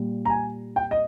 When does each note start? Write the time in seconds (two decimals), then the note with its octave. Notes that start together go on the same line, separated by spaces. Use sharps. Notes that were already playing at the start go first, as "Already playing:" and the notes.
Already playing: A#2 G3
0.25 A#5
0.30 G#5
0.76 G5
0.91 D#5